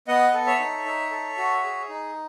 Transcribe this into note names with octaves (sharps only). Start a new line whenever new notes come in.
B3 D#5 F#5
A4
C#5 E5
D#4
D#4
A4
F#4
G#4
D#4